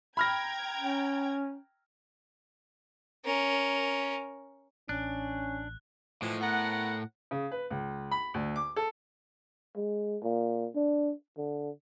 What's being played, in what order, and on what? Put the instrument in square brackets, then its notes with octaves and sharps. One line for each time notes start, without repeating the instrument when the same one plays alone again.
[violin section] G5 A#5 G#6 [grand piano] B5 F6 A#6
[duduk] C#4
[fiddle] C#4 A#4
[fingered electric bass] A1 [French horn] C#4 [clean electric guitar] D4 [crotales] F#6
[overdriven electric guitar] A2 [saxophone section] E3 F3 G#3
[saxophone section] B3 A#4 F#5
[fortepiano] C#3
B4
C#2
B5
D2
D6
A4
[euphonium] G#3
A#2
D4
D3